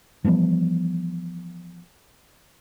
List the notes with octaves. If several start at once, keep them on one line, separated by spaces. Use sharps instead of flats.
E3 F3 G3 B3